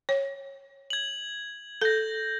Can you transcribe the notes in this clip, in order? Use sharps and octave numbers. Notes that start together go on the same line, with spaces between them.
C#5
G#6 F#7
A4 G6 A#6